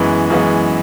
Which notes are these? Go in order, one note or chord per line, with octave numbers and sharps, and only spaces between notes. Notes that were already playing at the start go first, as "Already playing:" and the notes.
Already playing: F#2 E3 G#3 B3
F#2 E3 G#3 B3